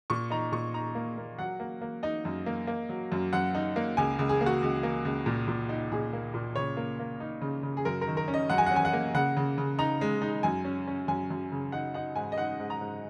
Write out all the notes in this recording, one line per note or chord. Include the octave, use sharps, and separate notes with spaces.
A#2 C#6
D#4 A#5
A#2 C#6
D#4 A#5
A#3
A#3
F#3 F#5
A#3
A#3
D#4 D#5
F#2
A#3
A#3
F#3
F#2
F#2 F#5
D#4
A#3
C#2 G#5
C#2
G#4
A#3
F#4
C#2
A#3
C#2
A#2
A#2
D#4
A#2 G#4
A#3
A#2
C#3 C#5
A#3
A#3
D#4
C#3
C#3
G#4
F#2 A#4
A#4
D#3
A#4
C#4
D#5
F#2 F#5
G#5
F#5
C#4
G#5
F#5
A#3
C#3 F#5
C#3
C#3
D#4 A#5
G#3
D#4
F#2 G#5
C#4
C#4
F#2 G#5
F#2
C#3
D#4 F#5
D#4 F#5
G#2 G#5
D#5
D#4 F#5
G#2
A#5
G#2